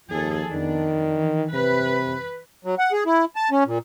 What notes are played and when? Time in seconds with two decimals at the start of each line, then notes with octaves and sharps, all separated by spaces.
0.11 D#2 F3 G#4 A4
0.51 F2 D#3 B3 D4
1.10 E3
1.54 C3 B4
2.65 F#3
2.79 F#5
2.92 G#4
3.06 E4
3.36 A5
3.51 C#4
3.66 A#2